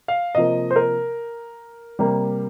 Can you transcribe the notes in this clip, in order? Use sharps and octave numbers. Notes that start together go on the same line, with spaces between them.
F5
C3 F3 A#3 D#5
C5
A#4
C3 G3 A#3